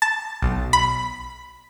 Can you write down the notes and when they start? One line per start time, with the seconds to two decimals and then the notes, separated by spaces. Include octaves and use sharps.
0.02 A5
0.42 B1
0.73 B5